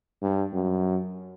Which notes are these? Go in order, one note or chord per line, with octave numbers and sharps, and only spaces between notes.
G2
F#2